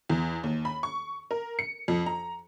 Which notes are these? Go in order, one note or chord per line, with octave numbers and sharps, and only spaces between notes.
E2
D#2
B5
C#6
A#4
C#7
F2
A#5